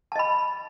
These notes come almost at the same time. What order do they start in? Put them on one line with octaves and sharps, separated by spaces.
A5 D#5 B5